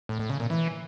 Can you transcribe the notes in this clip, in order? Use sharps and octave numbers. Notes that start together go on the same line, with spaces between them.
A2
A2
C#3
A#2
E3